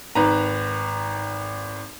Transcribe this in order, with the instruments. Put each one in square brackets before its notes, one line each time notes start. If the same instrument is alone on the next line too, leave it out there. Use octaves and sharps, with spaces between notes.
[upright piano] G#1 D#3 B4 A#5